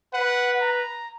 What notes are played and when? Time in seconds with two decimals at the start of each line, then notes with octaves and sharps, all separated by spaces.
0.13 B4 F#5
0.61 A#5